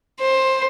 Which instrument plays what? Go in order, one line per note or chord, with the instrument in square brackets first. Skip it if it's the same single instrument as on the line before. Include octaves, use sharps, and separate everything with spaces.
[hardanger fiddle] C5